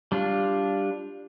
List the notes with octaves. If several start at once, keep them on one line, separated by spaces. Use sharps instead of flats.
G3 D4 F4